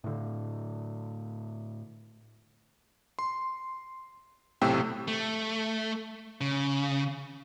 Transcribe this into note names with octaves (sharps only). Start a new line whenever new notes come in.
A2 D3
C6
B1 A2 C3 A3 G5 E6
A3
C#3